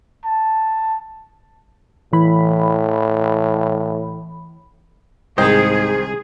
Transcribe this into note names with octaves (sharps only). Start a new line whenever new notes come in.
A5
A2 E3 B5
C2 G#2 D#3 G#4 C5 D#5 G5